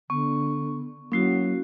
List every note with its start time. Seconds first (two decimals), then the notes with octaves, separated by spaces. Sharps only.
0.10 D3 B3 C#6
1.12 F#3 A#3 C#4 E4 F#4 C7